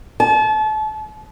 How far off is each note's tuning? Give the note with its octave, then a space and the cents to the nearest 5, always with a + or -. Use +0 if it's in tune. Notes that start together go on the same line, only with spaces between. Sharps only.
A5 -35